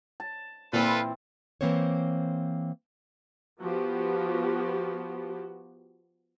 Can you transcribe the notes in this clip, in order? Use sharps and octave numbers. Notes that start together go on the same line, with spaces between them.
A5
A#2 E3 C4 F4 A4 B4
E3 A#3 C4 C5 C#5
F3 B3 F#4 G4